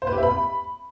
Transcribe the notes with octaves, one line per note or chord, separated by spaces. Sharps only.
C5
B4
G4
E5
B5